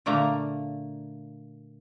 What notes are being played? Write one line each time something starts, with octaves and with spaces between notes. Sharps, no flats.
A#2 D3 A3 A#3 A#5